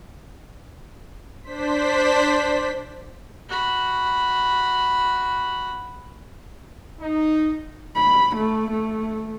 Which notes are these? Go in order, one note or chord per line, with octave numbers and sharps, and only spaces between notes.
D4 C5 B6
F#4 B5
D#4
B5
A3
A3